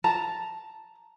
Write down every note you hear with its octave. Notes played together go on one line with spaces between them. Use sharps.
A5 A#5